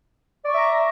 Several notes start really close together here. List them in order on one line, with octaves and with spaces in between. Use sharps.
D5 C#6 E5 A#5